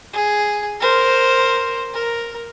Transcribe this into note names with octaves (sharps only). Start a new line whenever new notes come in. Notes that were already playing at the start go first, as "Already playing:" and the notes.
G#4
A#4 C5
A#4